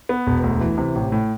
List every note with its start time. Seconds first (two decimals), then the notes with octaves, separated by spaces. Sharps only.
0.09 B3
0.27 E1
0.43 D2
0.60 E3
0.78 C3
0.95 A1
1.12 A2